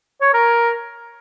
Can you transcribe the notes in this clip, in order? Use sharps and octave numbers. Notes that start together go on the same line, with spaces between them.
C#5
A#4